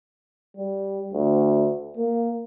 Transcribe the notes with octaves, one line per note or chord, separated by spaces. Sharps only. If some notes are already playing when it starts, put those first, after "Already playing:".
G3
D2
A#3